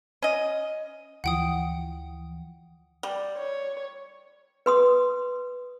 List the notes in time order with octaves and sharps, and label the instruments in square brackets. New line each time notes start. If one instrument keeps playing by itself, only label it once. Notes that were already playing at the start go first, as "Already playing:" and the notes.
[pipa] C#4 D#5
[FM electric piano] D2 E3 F3 [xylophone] F#5 G5 D#6
[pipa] G3
[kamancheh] C#5
[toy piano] B4 C6 D#6